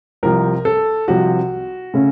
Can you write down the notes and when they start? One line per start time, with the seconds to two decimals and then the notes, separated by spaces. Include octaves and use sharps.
0.23 C2 C3 F3 A#4
0.65 A4
1.08 C2 C3 F3 F#4
1.94 C#3 A3 C#4